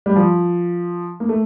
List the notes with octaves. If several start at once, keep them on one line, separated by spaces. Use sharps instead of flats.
G3
F3
A#3
A3